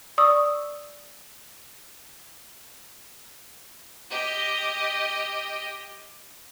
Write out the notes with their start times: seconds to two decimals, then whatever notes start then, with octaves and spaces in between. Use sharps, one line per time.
0.18 D5 C#6 D#6 E6
4.10 G4 D#5